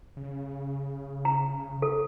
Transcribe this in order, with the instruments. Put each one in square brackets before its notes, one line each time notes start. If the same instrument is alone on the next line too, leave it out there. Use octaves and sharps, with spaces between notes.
[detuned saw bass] C#3
[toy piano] A#5
A4